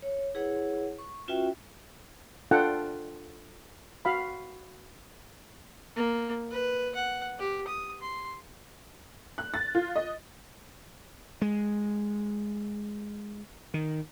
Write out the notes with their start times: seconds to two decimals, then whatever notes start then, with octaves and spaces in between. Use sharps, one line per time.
0.02 C#5
0.35 E4 G#4 B4 C#5 F#5
0.99 C#6
1.28 C#4 F4 F#4 B4 E5 G5
2.51 D4 F4 A4 F#5 G5
4.05 F#4 F5 B5
5.96 A#3
6.51 B4
6.96 F#5
7.39 G4
7.68 D#6
8.02 C6
9.38 F#6
9.54 A6
9.75 F4
9.96 D#5
11.42 G#3
13.74 D#3